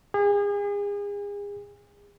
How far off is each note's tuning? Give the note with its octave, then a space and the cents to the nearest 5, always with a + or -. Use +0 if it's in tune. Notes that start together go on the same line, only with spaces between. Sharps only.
G#4 -35